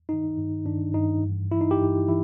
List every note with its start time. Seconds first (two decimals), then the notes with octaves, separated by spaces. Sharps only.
0.09 G2 D#3 D#4
0.37 G2 D#3
0.66 G2 D#3 D4
0.94 G2 D#3 D#4
1.23 G2 E3
1.51 G2 E3 E4
1.61 D#4
1.71 G4
1.80 G2 E3
2.08 E3 E4